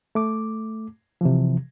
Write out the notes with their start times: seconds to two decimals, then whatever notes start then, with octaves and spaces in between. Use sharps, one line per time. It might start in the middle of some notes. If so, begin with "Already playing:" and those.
0.15 A3 D6
1.21 C3 E3 F3